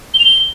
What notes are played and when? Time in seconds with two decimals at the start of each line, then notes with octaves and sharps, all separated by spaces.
0.14 G7
0.19 F7
0.25 G7